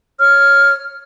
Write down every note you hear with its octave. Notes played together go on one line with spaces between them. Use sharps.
C#5 F6